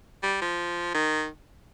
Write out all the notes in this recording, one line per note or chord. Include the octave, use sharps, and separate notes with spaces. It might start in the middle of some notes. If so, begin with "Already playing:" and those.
G3
F3
D#3